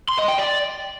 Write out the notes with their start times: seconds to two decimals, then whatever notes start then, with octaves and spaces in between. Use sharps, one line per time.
0.09 C6
0.18 D#5
0.28 G5
0.38 D5